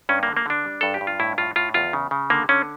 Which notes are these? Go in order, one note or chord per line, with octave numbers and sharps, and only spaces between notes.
G2 C#4
D3 A#3
A#3
D3 D4
G3
G2 A4
G4
G2
F4
A2 E4
A2 F4
A2 F4
E2 F4
C#3
C#3
D3 A#3
D3 C#4